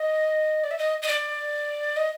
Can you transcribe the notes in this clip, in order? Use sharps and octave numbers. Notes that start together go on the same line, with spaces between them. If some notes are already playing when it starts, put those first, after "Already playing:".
Already playing: D#5
D5
E5
D#5
D#5
D5
D#5